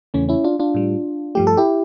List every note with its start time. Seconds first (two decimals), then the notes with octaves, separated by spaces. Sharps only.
0.14 E2 C#3 E3 A3 C#4
0.29 C#4 E4
0.44 D4 F4
0.59 D4 F4
0.75 A2 G3
1.35 G2 F3 A3 G4
1.47 A4
1.57 E4 G4